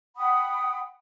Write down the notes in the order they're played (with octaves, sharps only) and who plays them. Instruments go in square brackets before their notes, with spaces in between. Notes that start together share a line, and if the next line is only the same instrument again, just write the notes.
[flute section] F#5 G5 B5 D#6